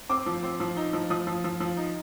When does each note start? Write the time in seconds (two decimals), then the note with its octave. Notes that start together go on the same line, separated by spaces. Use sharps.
0.10 C4 D6
0.26 F3
0.43 C4
0.60 F3
0.77 D#4
0.93 F3
1.10 F3 D#6
1.27 F3
1.44 F3
1.60 F3
1.77 D#4